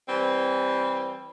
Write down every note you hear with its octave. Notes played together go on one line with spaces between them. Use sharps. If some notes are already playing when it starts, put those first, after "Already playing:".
E3 G3 C4